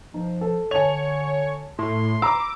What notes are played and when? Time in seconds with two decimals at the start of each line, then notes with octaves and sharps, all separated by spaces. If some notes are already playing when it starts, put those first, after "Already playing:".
0.14 F3 D#4
0.41 A4
0.71 D3 C#5 G#5 A5 F7
1.79 A2 C6
2.22 A#5 B5 D6 E6